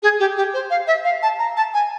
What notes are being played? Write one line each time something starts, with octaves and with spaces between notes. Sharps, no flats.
G#4
G4
G4
C5
F5
E5
F5
A5
A#5
A5
G#5